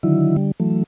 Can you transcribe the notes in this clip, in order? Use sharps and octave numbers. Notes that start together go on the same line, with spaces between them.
D3 D#3 F#3 E4
D3 G3
E3 F#3 A3